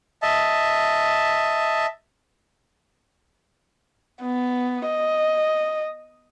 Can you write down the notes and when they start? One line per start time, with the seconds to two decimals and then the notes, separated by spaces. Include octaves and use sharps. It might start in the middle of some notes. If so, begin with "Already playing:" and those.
0.22 D#5 E5 A5
4.22 B3
4.86 D#5